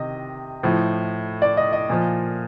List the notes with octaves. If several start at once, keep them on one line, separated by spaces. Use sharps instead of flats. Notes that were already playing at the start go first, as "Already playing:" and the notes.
Already playing: C3 D#3 D#5
A2 F3
D5
D#5
D#5
A#2 F3